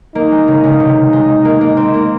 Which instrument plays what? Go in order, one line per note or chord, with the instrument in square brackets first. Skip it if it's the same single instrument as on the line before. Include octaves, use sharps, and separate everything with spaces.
[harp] A#3 [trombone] D#4
[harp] G#3
C#3
C#3
C3
G#3
A#3
A#3
C4
A#3